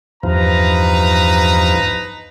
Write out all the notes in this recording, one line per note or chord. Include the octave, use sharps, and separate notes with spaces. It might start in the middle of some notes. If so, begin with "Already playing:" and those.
E2 G2 F3 D#4 B4 A#5